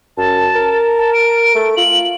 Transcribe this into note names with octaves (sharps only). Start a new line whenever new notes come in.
F#2 A5
A#4
A5
D7
A3
F4 F#7